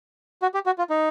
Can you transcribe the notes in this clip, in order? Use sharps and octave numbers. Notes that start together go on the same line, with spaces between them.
F#4
G4
F#4
F4
D#4